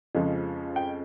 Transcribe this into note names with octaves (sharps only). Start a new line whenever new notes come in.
F2 C#3 F3 G#3
G5